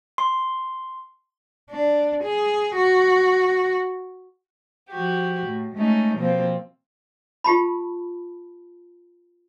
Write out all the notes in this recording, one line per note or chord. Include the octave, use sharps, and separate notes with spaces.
C6
D4
G#4
F#4
F3 F#4 G4
A2
G#3 A3 C#4 D#4
B2 F3 A#3 C4 F4
F4 G4 A5 B5